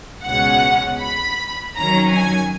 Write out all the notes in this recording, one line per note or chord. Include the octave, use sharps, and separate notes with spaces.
C#2 B2 G#3 C#4 F#5
B5
F2 D#3 F#3 C#4 A#5
G#5